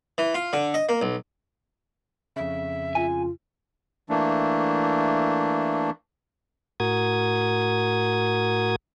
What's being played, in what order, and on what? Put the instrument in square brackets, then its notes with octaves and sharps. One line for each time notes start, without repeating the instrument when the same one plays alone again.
[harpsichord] E3
F4
D3
D#5
A#3
B1
[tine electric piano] F2 C#3 [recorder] E5
[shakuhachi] F4 [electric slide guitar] G#5
[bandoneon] E3 A3 A#3 D4
[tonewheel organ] A2 F#4 A#4 D#6 G#6